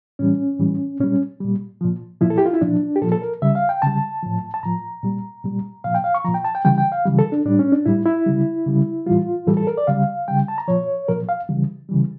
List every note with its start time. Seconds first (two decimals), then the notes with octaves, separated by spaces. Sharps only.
0.19 A2 E3 G3 C#4
0.59 A2 E3 G3
1.00 A#2 G3 C#4
1.40 A#2 G3
1.81 A#2 F3
2.21 A#2 F3 E4
2.30 A4
2.38 G4
2.46 F4
2.53 E4
2.61 A#2 F3 D4
2.96 G4
3.01 A#2 F3 A4
3.12 A4
3.22 A#4
3.42 C#3 G3 E5
3.55 F5
3.69 G5
3.82 C#3 G3 A5
4.23 A2 F3
4.54 A5
4.63 A2 F3 A#5
5.03 A#2 G3
5.44 A#2 G3
5.84 A#2 F3 F5
5.94 G5
6.04 F5
6.14 C#6
6.24 A#2 F3 A#5
6.34 G5
6.45 A5
6.55 G5
6.65 C#3 E3 G3 G5
6.78 G5
6.92 F5
7.05 C#3 E3 G3
7.19 A4
7.32 D4
7.45 A2 G3 D4
7.59 C#4
7.72 D4
7.86 A2 G3 E4
8.06 E4
8.26 C#3 G3
8.66 C#3 G3
9.06 A2 E3 G3 F4
9.47 A2 E3 G3 A4
9.57 A4
9.67 A#4
9.77 D5
9.87 C#3 G3 F5
10.28 C#3 G3 G5
10.48 A5
10.58 A#5
10.68 A#2 F3 C#5
11.08 A#2 F3 A#4
11.29 F5
11.49 C#3 E3 G3
11.89 C#3 E3 G3